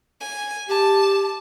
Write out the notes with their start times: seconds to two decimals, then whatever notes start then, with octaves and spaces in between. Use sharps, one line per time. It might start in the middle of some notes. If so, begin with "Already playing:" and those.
0.21 G#5
0.69 G4 A5